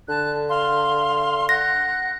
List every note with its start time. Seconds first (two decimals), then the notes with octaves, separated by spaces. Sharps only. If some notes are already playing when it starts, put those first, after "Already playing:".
0.09 D3 A5 F#6
0.49 F5 C6
1.49 F#5 F#6 A#6